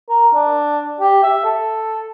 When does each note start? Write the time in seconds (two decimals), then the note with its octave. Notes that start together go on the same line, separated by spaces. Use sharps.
0.09 A#4
0.34 D4
1.00 G4
1.23 E5
1.44 A4